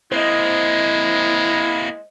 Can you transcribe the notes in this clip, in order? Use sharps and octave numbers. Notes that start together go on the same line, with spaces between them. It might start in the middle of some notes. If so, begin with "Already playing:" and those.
G#3 A#3 C4 E4 C5 D#5